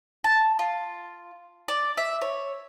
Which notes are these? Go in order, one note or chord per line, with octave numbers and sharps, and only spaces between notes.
A5
F4
D5
E5
C#5